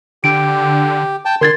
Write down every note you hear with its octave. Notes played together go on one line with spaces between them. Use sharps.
D3 G4 D7
G5 A5
D3 A#4 C6 G#6 A6